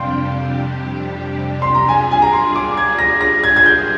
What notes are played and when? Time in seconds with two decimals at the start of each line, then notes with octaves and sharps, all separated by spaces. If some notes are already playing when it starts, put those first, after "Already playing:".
Already playing: F2 C3 G3 D4 G4 F5 C6
1.62 C6
1.74 A#5
1.89 G3 D4 F4 G#4 G#5
2.11 G#5
2.22 A#5
2.33 C6
2.56 D6
2.77 G#6
2.99 A#6
3.21 A#6
3.44 G#6
3.56 G#6
3.66 G6